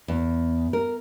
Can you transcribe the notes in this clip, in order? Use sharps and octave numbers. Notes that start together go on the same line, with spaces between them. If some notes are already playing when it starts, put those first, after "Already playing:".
E2
A#4